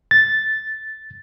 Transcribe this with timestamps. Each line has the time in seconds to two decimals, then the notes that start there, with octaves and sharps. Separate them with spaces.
0.11 A6